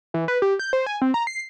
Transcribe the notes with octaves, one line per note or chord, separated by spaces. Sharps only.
E3
B4
G4
G6
C5
G#5
C4
A#5
C7